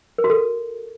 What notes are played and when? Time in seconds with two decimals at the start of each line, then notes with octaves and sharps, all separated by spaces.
0.18 A#4
0.24 F#4
0.30 A4